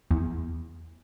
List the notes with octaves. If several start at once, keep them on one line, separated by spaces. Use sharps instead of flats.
E2